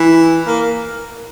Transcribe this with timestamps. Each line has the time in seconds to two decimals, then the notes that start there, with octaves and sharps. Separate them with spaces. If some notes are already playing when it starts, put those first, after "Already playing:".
Already playing: E3
0.47 A#3